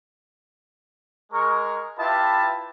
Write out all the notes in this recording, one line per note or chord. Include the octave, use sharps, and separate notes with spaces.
G#3 A#4 C#6
E4 F4 G4 B4 E5 A5